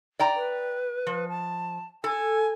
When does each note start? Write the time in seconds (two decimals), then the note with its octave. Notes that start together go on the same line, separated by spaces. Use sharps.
0.19 D5 G5 A#5
0.36 B4
1.07 F3
1.29 A5
2.04 A4 G#5